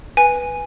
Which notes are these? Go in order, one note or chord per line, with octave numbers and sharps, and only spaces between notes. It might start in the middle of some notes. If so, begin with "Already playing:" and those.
B4 G#5